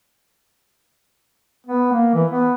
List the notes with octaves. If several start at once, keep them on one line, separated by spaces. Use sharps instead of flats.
B3
A#3
E3
B3